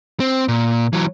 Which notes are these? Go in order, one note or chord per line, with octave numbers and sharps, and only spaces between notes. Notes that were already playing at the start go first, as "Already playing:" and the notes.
C4
A#2
E3 F#3